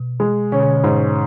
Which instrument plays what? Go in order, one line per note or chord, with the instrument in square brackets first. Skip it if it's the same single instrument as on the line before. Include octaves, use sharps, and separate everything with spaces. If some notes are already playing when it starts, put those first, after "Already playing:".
Already playing: [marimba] B2
[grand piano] G#3
[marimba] B2 D3 [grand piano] C#4
[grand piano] G#2